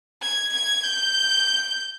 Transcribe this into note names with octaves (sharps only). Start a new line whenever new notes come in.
G#6
G#6
G6